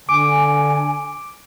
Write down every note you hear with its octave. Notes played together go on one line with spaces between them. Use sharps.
D3 G#5 D6 D7